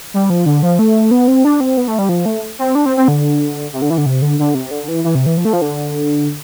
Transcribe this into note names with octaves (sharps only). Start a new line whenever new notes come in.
G3
F3
D3
F3
A3
B3
C4
D4
C4
B3
A3
G3
F3
A3
C4
D4
C4
C4
D3
C3
D3
E3
D3
C3
D3
D3
C3
D3
E3
E3
C3
E3
F3
A3
F3
D3